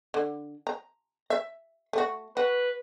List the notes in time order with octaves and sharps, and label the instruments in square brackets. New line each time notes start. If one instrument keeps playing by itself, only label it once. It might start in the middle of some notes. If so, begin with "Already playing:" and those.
[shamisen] D3
A#5
E5
A3 F#4
[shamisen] F#4 [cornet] B4